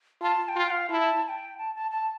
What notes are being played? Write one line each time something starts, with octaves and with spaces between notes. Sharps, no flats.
F4 A5
A5
G5
F4
G5
F5
E4 A5
A5
G5
A5
A5
A5